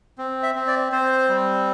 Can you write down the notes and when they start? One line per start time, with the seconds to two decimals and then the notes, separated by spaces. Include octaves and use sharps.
0.18 C4
0.43 E5
0.55 C4
0.67 D5
0.92 C4 C5
1.29 G3